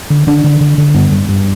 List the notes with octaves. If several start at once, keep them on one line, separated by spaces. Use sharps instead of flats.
D3
D3 D4
D3
D3
D3
G2 B3
G2
G2